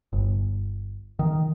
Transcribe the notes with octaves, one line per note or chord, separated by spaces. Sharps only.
G1
D#3